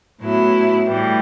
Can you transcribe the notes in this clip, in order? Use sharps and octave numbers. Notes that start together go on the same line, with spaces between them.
A2 F#3 B3 E4
A2 E3 G3